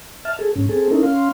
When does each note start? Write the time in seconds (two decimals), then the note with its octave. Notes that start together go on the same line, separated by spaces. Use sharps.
0.25 E5 A5 F6
0.39 G#4 A4
0.56 G#2 C#4
0.69 C4 G#4 A4
0.91 C#4 D#4 E4 A4 A#4
1.03 C#4 F5 C6